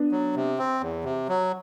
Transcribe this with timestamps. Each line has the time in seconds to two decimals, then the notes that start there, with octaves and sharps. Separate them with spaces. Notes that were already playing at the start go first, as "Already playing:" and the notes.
Already playing: B3 D4
0.12 F#3
0.35 C3
0.58 C4
0.81 E2
1.04 C3
1.28 F#3